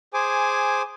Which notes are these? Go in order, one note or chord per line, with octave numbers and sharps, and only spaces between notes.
G#4 C5 G#5 D6